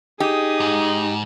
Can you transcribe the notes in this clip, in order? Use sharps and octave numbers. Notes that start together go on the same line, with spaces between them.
D#4 G4 G#4 D#6
G#2